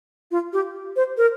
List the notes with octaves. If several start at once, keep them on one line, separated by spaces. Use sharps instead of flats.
F4
G4
C5
A#4